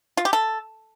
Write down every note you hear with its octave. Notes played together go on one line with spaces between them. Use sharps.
F4
G4
A4